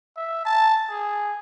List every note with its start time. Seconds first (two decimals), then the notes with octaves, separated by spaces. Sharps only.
0.17 E5
0.45 A5
0.89 G#4